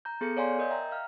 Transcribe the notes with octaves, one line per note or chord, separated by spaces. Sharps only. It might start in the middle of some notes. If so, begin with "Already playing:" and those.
A#5 G6
B3 G#4 A4 G6 C#7
C#5 D5 F5 G#5 C6
A#4 D#5 G6
E5 G5 A#5
F5 F6